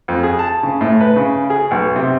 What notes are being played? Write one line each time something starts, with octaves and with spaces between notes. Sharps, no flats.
F2
G#4
A5
C#3
A2
B4
C#3
G#4
B1
C3